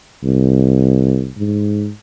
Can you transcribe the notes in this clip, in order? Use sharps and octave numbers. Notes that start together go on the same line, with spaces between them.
C2
G#2